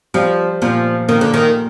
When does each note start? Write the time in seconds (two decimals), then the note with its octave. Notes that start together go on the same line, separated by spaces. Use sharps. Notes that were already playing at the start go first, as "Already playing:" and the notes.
0.14 F3 G3
0.62 A#2 F3
1.08 D#3 A#3
1.21 D3
1.34 D#3